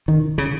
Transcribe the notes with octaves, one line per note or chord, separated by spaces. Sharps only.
D#3
C#3